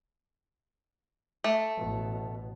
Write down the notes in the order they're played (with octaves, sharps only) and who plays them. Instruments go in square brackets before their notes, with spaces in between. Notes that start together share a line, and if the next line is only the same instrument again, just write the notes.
[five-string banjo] A3
[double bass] A1 B2